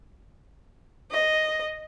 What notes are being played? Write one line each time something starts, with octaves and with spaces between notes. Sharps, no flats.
D#5